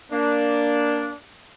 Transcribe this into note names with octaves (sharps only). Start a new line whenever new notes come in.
A#3 D4